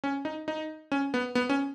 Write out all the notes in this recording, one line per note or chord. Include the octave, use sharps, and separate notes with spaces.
C#4
D#4
D#4
C#4
B3
B3
C#4